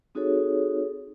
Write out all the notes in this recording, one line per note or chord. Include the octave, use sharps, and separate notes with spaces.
C4 D#4 F#4 G#4 A4 C#5